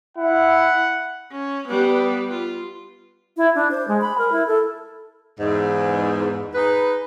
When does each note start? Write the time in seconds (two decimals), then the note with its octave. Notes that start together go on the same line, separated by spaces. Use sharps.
0.17 E4 F#5
1.32 C#4
1.69 G3 B3
2.30 F4
3.37 E4
3.55 D4
3.71 C5
3.88 G#3
4.01 B5
4.18 A#4
4.32 E4
4.47 A4
5.39 E2 G#2
6.55 D#4 G#4 B4